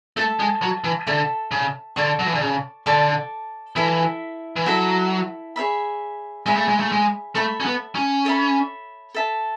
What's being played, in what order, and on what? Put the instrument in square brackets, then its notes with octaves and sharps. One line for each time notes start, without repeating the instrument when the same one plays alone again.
[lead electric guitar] A3 [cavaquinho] A4 E5 A5
[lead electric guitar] G#3
F#3
E3
[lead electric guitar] D3 [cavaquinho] A4 E5 A5
[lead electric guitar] C#3
[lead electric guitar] D3 [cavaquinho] A4 D5 A5 C#6
[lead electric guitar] F#3
E3
D3
C#3
[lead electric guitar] D3 [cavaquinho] A4 D5 A5 C#6
[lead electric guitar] E3 [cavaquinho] E4 A4 E5
[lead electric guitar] E3
[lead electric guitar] F#3 [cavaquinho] E4 A4 E5
[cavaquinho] G#4 C#5 E5 B5
[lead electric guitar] G#3 [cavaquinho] G#4 C#5 E5 B5
[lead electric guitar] A3
G#3
A3
G#3
[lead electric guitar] A3 [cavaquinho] A4 C#5 E5 B5
[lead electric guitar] C#4
B3
C#4
[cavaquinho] A4 C#5 E5 B5
A4 E5 A5